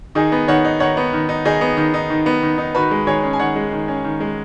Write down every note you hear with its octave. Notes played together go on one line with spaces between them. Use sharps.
D#3 D#4 G#4
B3
D#3 C#5 F#5
D#4
D#3 C#5 F#5
B3
D#3
D#4
D#3 D#4 G#4
B3
D#3
D#4
D#3
B3
D#3
D#4
D#3 F#4 B4
G#3
D#3 G#4 C#5
C#4
G#5
D#3 C#5 F#5
G#3
D#3
C#4
D#3
G#3